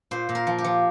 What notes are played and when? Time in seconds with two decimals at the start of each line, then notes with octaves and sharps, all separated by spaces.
0.11 A#2 C5
0.29 A#2
0.35 A#4
0.47 F3
0.58 G4
0.64 F3